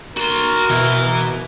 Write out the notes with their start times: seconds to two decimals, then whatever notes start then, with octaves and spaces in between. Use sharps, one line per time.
0.17 F#4 A#4 C6
0.70 B2 E3